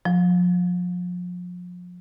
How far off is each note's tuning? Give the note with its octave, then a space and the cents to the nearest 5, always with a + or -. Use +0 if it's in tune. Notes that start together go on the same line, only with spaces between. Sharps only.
F3 +35